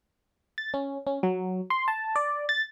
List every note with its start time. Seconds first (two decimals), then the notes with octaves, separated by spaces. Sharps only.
0.58 A6
0.74 C#4
1.07 C#4
1.23 F#3
1.70 C6
1.88 A5
2.16 D5
2.49 A6